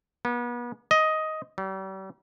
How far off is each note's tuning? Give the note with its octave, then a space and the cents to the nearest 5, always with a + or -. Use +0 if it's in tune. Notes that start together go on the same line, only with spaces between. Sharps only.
B3 -35
D#5 +10
G3 -40